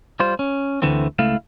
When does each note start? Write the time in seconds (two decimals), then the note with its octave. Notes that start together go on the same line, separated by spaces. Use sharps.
0.20 G3 F4 C5
0.39 C#4
0.82 D2 D3 E3 A3 C4
1.19 C#2 A3 E4 F5